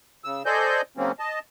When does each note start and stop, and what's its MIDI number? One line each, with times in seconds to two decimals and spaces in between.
0.24 0.43 49
0.24 0.43 88
0.46 0.81 69
0.46 0.81 72
0.46 0.81 74
0.46 0.81 75
0.46 0.81 80
0.46 0.81 91
0.97 1.12 49
0.97 1.12 54
0.97 1.12 58
0.97 1.12 60
0.97 1.12 61
1.19 1.39 75
1.19 1.39 81